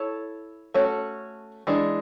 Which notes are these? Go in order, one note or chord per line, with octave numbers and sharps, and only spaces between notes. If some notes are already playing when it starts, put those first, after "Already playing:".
Already playing: E4 A4 C#5
A3 C#4 F#4 C#5
E3 G#3 D4